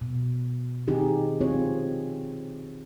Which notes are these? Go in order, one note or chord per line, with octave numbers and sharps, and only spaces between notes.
B2
D#3 C4 D#4 G4 G#4
C4 F4 G#4 C#5